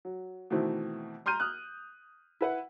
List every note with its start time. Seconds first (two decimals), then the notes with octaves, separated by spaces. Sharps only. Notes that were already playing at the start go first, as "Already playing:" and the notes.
0.05 F#3
0.50 B2 D#3 E3 A3 C4
1.26 A#5 C6 F6 G6 D#7
1.40 D#6 F6 F#6
2.41 E4 B4 F#5